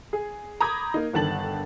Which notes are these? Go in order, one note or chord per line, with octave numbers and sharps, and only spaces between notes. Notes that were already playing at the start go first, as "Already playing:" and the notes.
G#4
A#5 B5 D6 D#6 G6 G#6
A#3 D#4
G1 D3 D#3 A5 A6 F#7